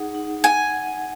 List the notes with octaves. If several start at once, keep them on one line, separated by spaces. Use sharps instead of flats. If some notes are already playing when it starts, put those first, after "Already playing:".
Already playing: D#4 G#4 F#5
D#4
F#5 G#5
F#5